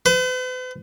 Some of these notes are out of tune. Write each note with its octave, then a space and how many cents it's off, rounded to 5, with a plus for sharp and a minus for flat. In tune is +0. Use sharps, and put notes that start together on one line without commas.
B4 +45